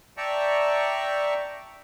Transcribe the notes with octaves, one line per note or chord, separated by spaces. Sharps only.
D5 E5 G5 A5 A#5 C#6